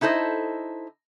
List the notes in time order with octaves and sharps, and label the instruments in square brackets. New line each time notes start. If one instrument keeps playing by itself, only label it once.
[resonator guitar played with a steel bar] D#4 E4 A4 C5 D#5